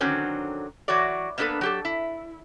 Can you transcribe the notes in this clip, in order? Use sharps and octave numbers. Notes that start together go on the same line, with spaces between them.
D3 D#3 F#3 C4 C#4
E3 F#3 F#4 C#5 D5
A#3 B3 D4 G#4 A4 B4
F#3 G4 A4
E4